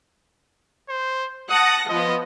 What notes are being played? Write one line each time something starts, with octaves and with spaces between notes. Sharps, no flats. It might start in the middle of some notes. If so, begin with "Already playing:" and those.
C5
F#5 A5 D#6 A#6
F3 B3 D#5